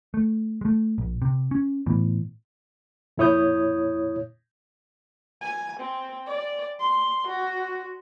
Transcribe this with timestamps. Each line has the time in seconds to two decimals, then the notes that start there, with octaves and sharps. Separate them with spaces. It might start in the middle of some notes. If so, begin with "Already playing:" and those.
0.14 A3
0.61 G#3 A3
0.98 A#1
1.22 C3
1.51 C#4
1.86 A2 E3 B3
3.18 F2 A#2 E4 C#5 D#6 G6
5.41 G#5
5.80 C4
6.27 D5
6.79 C6
7.27 F#4